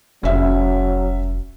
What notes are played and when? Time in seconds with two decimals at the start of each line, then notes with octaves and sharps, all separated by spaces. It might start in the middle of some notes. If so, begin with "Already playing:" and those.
0.23 F1 F#3 C#4 E5